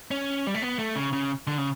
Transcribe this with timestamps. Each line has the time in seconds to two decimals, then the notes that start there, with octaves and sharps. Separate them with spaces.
0.11 C#4
0.47 G3
0.55 A3
0.62 B3
0.79 A3
0.96 C#3
1.13 C#3
1.47 D3
1.58 C#3